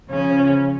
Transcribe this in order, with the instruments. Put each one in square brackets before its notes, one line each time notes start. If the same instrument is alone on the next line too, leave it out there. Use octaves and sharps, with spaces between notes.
[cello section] C#3 F3 [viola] C#4